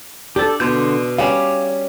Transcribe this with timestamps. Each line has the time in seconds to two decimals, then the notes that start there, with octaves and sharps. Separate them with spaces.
0.36 D4 G4 A4
0.60 B2 D3 C6 G6
1.18 G3 C#4 C#5 F5 D6